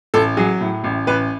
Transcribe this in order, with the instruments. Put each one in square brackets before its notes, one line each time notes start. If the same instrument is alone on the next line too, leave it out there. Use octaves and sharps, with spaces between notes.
[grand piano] A1 A4
F#3 G#4
A2
A1
A1 B4